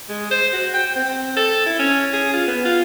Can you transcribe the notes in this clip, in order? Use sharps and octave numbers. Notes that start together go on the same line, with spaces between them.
G#3
C5
F#4
G5
C4
A4
E4
C#4
G#4
F4
B3
F4